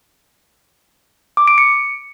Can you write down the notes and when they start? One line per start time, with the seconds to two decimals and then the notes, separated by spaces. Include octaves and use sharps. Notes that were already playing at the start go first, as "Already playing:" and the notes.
1.37 D6
1.48 D7
1.58 C#7